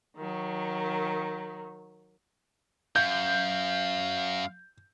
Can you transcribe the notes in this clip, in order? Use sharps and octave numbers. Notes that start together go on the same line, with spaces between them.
D#3 F#3
F#2 F5 G6